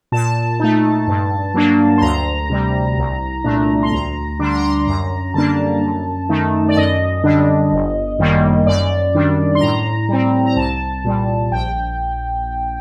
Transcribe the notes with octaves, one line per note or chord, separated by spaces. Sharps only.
A#2 A5
A3 D#4
G2
F#3 A#3 D4
C6
D2 A#5
C3 G3
C2
A#2 A3 D4
C6
D2 A#5
D3 G3 D4 D6
C6
A#5
C6
F#2 A#5
D3 G3 A#3 D4 A5
F#2
D#3 A3 D#4
D5
F#2 D#5
D3 G3 D4
G1
F#2 D#3 G3 A#3
F#2 D5
D#3 G3 D4
C6
A2 A#5
G3 C4
A#5
C2 A5
A#2 G3
A#1 G5